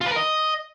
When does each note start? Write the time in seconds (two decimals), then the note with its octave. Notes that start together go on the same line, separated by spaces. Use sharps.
0.01 F4
0.06 B4
0.11 A#4
0.16 D#5